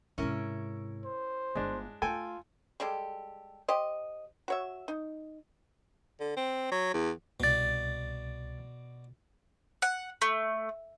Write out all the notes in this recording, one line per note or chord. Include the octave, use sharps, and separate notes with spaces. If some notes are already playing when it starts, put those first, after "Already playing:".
G#2 C3 C#4 E4 A#4
C5
G1 G#3 D4
A3 F4 A4 G5 G#5
G3 G#3 G4 A4
G4 C5 D#5
F#4 C#5 E5
D#4
D3
C4
F#3
E2
C2 B2 D5 A6
F#5
A3